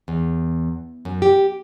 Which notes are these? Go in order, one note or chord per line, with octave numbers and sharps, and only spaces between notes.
E2
F#2
G4